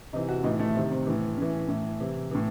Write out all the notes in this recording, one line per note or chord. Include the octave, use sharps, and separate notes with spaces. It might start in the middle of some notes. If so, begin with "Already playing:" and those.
C3 E3 D#4
F#4
A2 E3 D#4
A3
C3 D#3 C4
C4
A2 E3
A2 E3 C#4
A2 E3
C3 E3 E4
A2 E3